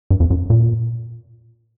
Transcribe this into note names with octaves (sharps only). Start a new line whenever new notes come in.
G2
F2
F#2
A#2